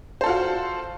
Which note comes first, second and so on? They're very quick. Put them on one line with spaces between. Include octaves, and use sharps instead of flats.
C5 A4 F4 F#4